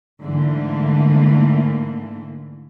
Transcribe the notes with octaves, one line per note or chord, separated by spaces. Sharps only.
G#2 D3 E3 A3 A#3